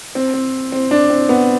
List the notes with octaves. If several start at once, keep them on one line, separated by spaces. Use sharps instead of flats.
C4
C4
C4
D4
C4
B3